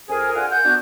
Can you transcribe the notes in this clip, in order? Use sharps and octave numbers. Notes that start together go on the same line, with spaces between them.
F2 G#4 A#4 G#5
D4 F4 F#5 G#5
F#5 G6
B3 D4 F#4